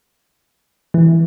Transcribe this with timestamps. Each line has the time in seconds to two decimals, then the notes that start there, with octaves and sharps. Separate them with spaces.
0.94 E3